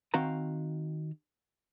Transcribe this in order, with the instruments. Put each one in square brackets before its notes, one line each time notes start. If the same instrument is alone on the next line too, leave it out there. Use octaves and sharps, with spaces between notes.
[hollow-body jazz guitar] D#3 C4 F#4 F5 G5 A#5